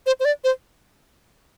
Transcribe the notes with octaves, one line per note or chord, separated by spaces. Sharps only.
C5
C5
D5
C5